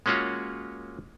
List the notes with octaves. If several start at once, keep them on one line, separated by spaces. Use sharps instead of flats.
G#3 A#3 C#4 F4 F#4 C#5